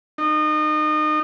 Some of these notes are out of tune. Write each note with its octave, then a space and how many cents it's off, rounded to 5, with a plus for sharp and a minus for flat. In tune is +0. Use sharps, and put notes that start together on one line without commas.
D#4 -30